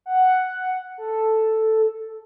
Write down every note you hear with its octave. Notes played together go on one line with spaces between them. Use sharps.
F#5
A4